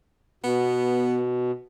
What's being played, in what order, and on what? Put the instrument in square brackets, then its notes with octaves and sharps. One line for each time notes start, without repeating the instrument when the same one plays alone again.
[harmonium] B2 [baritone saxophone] B3